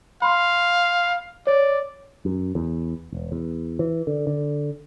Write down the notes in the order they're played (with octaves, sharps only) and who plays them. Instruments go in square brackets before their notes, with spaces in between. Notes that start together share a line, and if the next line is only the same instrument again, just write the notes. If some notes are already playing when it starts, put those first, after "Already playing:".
[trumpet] F5 [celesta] B5 C6
[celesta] C#5 [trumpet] D5
[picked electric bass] F#2
E2
E1
E2
E3
D3
D3